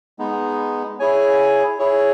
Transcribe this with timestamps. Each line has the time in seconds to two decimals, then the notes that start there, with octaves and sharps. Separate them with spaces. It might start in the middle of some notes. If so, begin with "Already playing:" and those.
0.19 G#3 B3 D#4
0.99 E4 G#4 C#5 G#5
1.79 E4 G#4 C#5